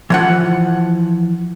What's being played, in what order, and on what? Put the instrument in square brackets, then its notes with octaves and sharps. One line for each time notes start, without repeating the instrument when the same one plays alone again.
[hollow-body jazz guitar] E3 F3 F#5